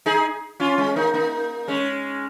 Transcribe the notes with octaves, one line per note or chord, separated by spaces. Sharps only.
D#4 G#4
C#4 F4
G#3 C#4
A#3 D#4
A#3 D#4
G#3 C#4